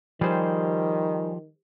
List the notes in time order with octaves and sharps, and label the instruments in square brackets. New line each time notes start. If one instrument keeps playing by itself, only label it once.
[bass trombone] D#3 [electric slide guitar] F3 G4 [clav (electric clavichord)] G3 G#4 C5